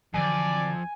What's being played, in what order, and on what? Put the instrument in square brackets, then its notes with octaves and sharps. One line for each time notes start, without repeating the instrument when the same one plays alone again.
[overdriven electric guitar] F2 [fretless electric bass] D3 E3 F#3 [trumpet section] D5 [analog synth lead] G#5